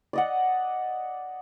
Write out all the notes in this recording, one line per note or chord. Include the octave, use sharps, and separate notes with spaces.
D5 D#5 F#5